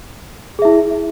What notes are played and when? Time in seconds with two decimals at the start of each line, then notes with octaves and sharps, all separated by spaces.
0.59 G#4
0.62 E5
0.65 E4